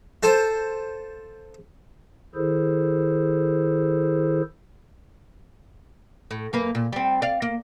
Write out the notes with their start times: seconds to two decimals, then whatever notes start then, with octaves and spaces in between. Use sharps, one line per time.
0.23 F4 A4 C5
2.35 D#3 E4 G#4 A4 C5
6.31 A2
6.53 F#2 A#3 B4
6.75 A#2
6.93 G3 C4
7.22 D5 F5
7.42 A#3